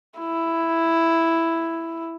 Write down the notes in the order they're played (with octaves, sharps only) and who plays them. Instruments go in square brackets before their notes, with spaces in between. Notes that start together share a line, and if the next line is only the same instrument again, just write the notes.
[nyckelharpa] E4